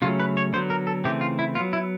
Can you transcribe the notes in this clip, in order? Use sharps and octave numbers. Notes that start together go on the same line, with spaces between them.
C#3 F#3 A3 C#4 F4
B4
C#5
D3 F#3 B3 C5
A#4
A4
C#3 E3 A3 C4 G4
F4
E4
F#3 B3 F4
E4